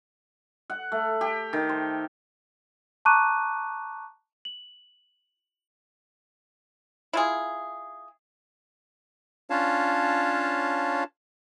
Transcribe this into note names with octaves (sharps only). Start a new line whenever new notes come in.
F#5
A3
G4
D#3
C5
A5 A#5 C#6 D6 F#6 D#7
F#7
E4 F4 G#4
C#4 D4 F4 C#5 F5 A5